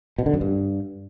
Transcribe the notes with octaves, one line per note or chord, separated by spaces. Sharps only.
B2
D3
F#2
G2